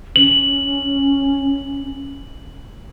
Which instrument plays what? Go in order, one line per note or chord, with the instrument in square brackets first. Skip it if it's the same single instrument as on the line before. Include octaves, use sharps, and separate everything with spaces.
[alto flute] C#4 [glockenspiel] F#7